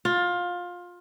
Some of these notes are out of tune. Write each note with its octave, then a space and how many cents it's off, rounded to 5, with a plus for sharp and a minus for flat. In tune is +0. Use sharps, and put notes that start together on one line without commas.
F4 +20